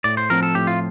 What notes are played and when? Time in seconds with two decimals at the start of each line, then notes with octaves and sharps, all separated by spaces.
0.04 A2 D5
0.17 C5
0.30 F3 C4 A#4
0.43 A4
0.55 A2 G4
0.67 F4